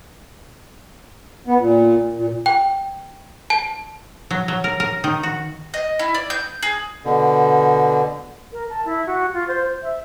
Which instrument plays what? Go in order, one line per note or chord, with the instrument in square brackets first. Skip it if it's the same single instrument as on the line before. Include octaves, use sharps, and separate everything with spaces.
[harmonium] B3
A#2
A#2
[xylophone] G5
A5
[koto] F#3
F#3
A#4
A#4
D#3
F#4
[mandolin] D#5
E4
D5
G6
G#4
[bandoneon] B2 D3
[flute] A#4
A5
E4
F#4
F4
C5
E5